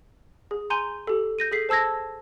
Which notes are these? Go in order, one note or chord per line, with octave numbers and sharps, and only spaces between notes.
G#4
G#5 A#5 C6 G6 D#7
G4 A4
G6 A#6 D#7
G#4 A4 B6 C7
C5 A5 E6 G#6 A#6